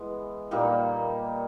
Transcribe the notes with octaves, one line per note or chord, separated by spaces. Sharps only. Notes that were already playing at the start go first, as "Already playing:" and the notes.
Already playing: E3 G#3 B3 E4
A#2 G3 A#3 D#4